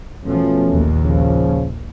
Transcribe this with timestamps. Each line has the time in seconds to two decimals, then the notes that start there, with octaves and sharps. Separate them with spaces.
0.24 E2 B2 F3 A3 C#4
0.74 A#1 D#2
1.04 C#3 F3